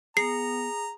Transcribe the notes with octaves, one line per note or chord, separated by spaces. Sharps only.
B3 G#4 A#5 C7